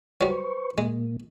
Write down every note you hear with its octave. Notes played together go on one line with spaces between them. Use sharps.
F#3 G3 B4 C5 C#6
A#2 G#3 A#3